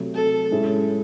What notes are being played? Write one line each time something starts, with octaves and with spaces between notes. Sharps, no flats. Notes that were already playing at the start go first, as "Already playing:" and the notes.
Already playing: C3 F#3 A3
A4
A2 G#3 C#4 E4 G#4